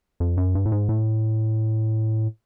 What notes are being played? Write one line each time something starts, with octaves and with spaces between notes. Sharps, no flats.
F2
F#2
G2
A2
G#2
A2